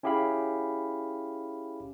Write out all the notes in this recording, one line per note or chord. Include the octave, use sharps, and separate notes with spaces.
C#4 E4 G4 G#4 F5 B5